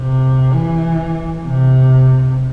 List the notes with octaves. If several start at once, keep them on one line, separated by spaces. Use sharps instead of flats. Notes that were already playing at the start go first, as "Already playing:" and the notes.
Already playing: C3
E3
C3